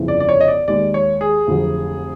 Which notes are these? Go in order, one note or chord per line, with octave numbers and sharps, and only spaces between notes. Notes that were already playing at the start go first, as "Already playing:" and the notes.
Already playing: G1 F2 C#3 E3
D5
D5
C#5
D#5
D5
D#2 D#3 G#3 D5
C#5
G#4
F1 F2 D3 F#3